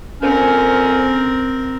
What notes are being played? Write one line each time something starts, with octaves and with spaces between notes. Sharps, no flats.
F2 A#2 C4 C#4 A#4